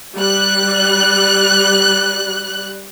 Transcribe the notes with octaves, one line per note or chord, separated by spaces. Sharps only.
G3 F#6